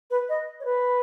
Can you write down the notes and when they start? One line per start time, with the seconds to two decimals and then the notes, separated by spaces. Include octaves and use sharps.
0.11 B4
0.29 D#5
0.60 C#5
0.65 B4